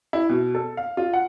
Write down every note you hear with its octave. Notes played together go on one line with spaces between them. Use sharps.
E4
B2
A4
F5
F4
F#5